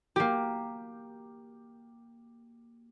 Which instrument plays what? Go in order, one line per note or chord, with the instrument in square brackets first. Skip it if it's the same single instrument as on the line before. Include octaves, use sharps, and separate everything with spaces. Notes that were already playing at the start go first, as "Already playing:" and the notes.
[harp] A#3 G4